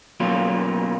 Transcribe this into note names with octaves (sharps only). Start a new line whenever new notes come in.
B2 F#3 A#3 C#4 F4